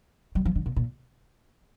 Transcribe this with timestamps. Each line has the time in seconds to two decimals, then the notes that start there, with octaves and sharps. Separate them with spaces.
0.35 G3
0.45 F3
0.56 D3
0.66 A#2
0.76 A#2